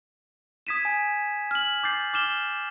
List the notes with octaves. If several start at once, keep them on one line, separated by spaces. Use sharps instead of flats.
D#6 G#6 B6 D#7 E7
G#5
F6 F#7
D6 G6 A6 C7
D6 F6 E7 G7